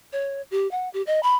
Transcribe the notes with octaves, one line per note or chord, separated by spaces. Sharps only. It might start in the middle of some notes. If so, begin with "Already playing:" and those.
C#5
G4
F#5
G4
D#5
B5